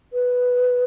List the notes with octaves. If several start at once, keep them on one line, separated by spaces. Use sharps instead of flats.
B4